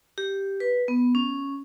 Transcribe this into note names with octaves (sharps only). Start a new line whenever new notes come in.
G4
B4
B3
C#4